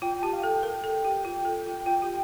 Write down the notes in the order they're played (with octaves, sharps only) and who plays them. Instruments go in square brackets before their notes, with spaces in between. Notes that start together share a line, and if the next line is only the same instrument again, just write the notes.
[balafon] F4 [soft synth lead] G5
[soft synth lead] G5
[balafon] G4 [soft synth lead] A5
[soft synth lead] F5
[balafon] A4 [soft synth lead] G5
[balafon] A#4
A4
G4
F4
A4
F4
[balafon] F4 [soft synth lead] G5
[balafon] G4